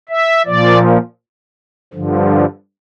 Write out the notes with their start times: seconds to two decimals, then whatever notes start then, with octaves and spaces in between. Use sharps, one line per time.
0.09 E5
0.46 A#2 F3 D5
1.93 G2 D3 F3